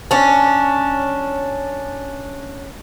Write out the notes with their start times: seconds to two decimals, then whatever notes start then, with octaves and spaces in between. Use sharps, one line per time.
0.11 C#4 D4